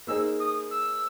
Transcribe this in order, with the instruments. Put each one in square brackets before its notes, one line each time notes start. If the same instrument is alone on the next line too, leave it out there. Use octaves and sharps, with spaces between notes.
[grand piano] A#3 D#4 G#4 C5 [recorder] E6
[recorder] D#6
E6